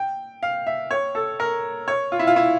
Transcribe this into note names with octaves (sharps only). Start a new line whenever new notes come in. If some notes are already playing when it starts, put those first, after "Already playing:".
Already playing: G5
F5
E5
C#5
A4
A#4
C#5
F4
E4
F4
E4